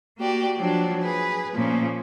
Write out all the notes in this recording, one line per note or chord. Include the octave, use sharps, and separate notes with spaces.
A#3 F#4 G4 D5
F3 F#3 D4
G#4 B4
A#2 C#3 F3 A#3